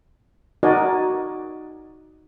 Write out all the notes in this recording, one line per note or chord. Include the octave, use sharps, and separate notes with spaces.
D#4 F#4 A#4 D5 D#5 G#5